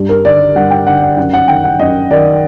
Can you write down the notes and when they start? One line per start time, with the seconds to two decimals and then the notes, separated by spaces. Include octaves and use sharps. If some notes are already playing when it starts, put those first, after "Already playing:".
Already playing: G2
0.09 A#4
0.24 D3 D5
0.56 G2 F#5
0.71 G5
0.86 D3 F#5
1.02 F#5
1.17 F#2 F#5
1.33 F#5
1.48 D#3 G5
1.64 F#5
1.79 F#2 D#5
2.11 D#3 D5